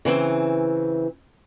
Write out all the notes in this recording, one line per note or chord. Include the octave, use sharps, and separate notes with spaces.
C#3 E3 C4